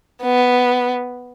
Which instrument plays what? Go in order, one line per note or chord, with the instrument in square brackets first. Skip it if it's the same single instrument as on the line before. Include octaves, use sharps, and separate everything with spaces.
[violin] B3